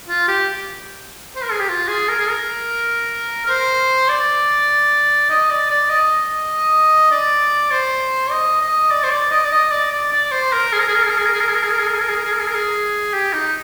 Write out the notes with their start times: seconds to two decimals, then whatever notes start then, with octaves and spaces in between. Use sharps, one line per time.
0.08 F4
0.28 G4
1.36 C5
1.43 A#4
1.51 G#4
1.60 G4
1.69 F4
1.88 G#4
2.08 A#4
2.19 G#4
2.29 A#4
3.46 A#4
3.49 C5
4.09 D5
5.30 D#5
5.51 D5
5.70 D5
5.90 D#5
7.11 D5
7.71 C5
8.31 D#5
8.62 D#5
8.91 D5
9.04 C5
9.12 D5
9.31 D#5
9.45 D5
9.52 D#5
9.71 D5
9.92 D5
10.12 D5
10.31 C5
10.52 A#4
10.73 G#4
10.80 A#4
10.88 G#4
10.95 A#4
11.03 G#4
11.10 A#4
11.18 G#4
11.26 A#4
11.33 G#4
11.40 A#4
11.49 G#4
11.55 A#4
11.63 G#4
11.71 A#4
11.79 G#4
11.87 A#4
11.94 G#4
12.01 A#4
12.09 G#4
12.17 A#4
12.25 G#4
12.33 A#4
12.39 G#4
12.47 A#4
12.54 G#4
13.13 G4
13.33 D#4